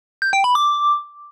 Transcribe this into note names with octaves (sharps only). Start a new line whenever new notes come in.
G6
G5
B5
D6